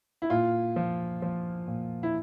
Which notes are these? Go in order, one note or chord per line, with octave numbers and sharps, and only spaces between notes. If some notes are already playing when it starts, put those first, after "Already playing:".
E4
A#2 F4
F3
F3
A#2
E4